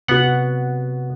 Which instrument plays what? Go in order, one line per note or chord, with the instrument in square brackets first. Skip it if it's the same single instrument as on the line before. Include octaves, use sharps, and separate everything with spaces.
[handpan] C3 F#4 [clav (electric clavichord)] B3 F#5